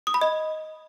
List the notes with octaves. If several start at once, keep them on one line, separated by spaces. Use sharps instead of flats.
D#6
B5
D#5